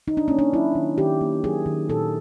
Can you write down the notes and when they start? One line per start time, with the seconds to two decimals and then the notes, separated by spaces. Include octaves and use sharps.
0.07 D#3 D#4
0.17 D4
0.28 A#3 C#4
0.39 D4
0.53 F#3 E4
0.75 D#3
0.98 D#3 G4
1.21 A#3
1.44 F#3 G#4
1.66 D#3
1.89 A#2 A4